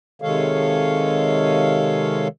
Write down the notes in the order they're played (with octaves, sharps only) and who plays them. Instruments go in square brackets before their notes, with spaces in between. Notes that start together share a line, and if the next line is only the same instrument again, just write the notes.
[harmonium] C3 D#3 G#3 A4 C#5 F5